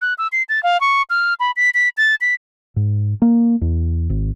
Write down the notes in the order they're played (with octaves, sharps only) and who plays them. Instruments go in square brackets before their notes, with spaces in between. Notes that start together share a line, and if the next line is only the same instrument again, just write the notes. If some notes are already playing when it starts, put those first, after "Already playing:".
[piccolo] F#6
E6
C7
A6
F5
C#6
F6
B5
B6
B6
A6
B6
[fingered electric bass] G#2
A#3
E2
G#1